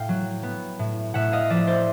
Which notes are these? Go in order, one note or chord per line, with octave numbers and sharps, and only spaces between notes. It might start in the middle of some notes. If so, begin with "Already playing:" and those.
Already playing: A2 F5 G5
F#3
B3
A2
A2 E5 F#5
D#5 F5
F3 D5 E5
C5 D5